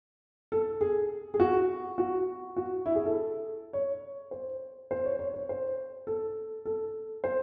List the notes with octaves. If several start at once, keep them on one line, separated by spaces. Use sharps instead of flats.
A4
G#4
G#4
F#4
F#4
F#4
E4
G#4
A4
C#5
C5
C5
C#5
C#5
C#5
C5
A4
A4
C5